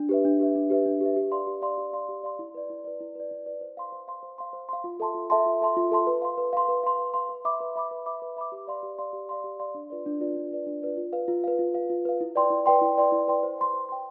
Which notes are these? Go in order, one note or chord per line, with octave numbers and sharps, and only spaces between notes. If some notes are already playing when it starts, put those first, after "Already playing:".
Already playing: D4
G4 B4 E5
D4
G4 B4 E5
D4
G4 B4 E5
D4
G4 B4 E5
G4
D5 F5 C6
G4
D5 F5 C6
G4
D5 F5 C6
G4
D5 F5 C6
E4
B4 D5
E4
B4 D5
E4
B4 D5
E4
B4 D5
C5
F5 C6
C5
F5 C6
C5
F5 C6
C5
F5 C6
F4
A4 E5 A5 C6
F4
A4 E5 A5 C6
F4
A4 E5 A5 C6
F4
A4 E5 A5 C6
B4
F5 C6
B4
F5 C6
B4
F5 C6
B4
F5 C6
B4
E5 B5 D6
B4
E5 B5 D6
B4
E5 B5 D6
B4
E5 B5 D6
G4
D5 F5 C6
G4
D5 F5 C6
G4
D5 F5 C6
G4
D5 F5 C6
D4
F4 B4 D5
D4
F4 B4 D5
D4
F4 B4 D5
D4
F4 B4 D5
F4
B4 F5
F4
B4 F5
F4
B4 F5
F4
B4 F5
E4
B4 D5 G5 C6
E4
B4 D5 G5 C6
E4
B4 D5 G5 C6
E4
B4 D5 G5 C6
C5
G5 C6
C5
G5 C6